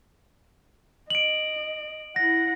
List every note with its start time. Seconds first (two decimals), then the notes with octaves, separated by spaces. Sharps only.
1.10 D#5 D7 F#7
2.16 E4 F#5 A#6